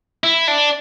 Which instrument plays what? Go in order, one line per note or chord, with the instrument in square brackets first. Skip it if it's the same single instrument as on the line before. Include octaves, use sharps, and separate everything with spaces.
[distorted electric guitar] E4
D4